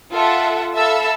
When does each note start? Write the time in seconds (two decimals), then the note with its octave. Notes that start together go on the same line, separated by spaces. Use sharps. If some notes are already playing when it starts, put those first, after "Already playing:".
0.12 F4 A4 E5 F#5
0.75 A4 E5 F5 A5 B5 E6